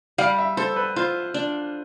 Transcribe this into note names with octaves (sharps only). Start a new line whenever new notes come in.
G3 F5
E5
A4 C5
B4
F4 C5
D4